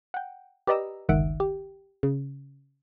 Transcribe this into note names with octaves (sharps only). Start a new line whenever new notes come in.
F#5 G5
G4 B4 D5 D#5 A#5 E6
G1 C#2 D#3 E5 F#5 D7
G4
C#3